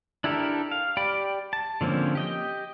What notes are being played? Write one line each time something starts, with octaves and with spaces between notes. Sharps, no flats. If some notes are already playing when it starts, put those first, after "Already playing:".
D4 E4 G4 A4 A#4
F5
G4 D5 G5 B5
A5
D3 F3 A#3 C4 C#4
G4 D#5 G5